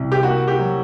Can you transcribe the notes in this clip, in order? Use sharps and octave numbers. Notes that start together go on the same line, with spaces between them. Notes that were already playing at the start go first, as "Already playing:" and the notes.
Already playing: C2
G4
A#3 F#4
G4
F#3